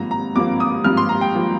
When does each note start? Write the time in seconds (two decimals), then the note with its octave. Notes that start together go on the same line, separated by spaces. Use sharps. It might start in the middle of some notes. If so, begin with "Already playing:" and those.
Already playing: G#1 G2 F3 A#3 A#5
0.11 A#5
0.35 G#1 G2 F3 A#3 D6
0.60 D#6
0.84 G#1 G2 F3 A#3 F6
0.97 C6
1.09 A#5
1.21 G5
1.34 F3 A#3